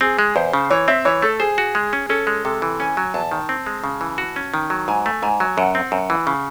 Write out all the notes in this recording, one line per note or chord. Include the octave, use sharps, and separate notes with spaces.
C4 G#4
G#3
E2 C5
C#3
E3 C#5
C4 E5
E3 C#5
A3 A4
G#4 C5
F#4
G#3
C#4
C#4 A4
G#3
C3 A4
E3
C#4 G#5
F#3
E2 A5
D#3
C4
G#3
C#3
E3
F#4
C#4
D#3
F#3
G#2 G#5
A3
G#2 G#5
F#3
F#2 F#5
C4
F#2
E3
C#3